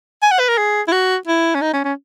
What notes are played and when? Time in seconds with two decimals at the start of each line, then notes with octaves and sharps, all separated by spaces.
0.22 G#5
0.32 F#5
0.39 B4
0.49 A#4
0.57 G#4
0.88 E4
0.92 F#4
1.27 E4
1.55 C#4
1.61 D#4
1.73 C#4
1.85 C#4